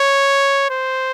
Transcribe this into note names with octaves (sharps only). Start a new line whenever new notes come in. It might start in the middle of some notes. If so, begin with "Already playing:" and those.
Already playing: C#5
C5